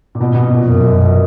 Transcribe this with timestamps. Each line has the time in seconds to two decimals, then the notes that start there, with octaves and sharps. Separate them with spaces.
0.15 A#2
0.21 B2
0.35 B2
0.50 A#2
0.65 F#2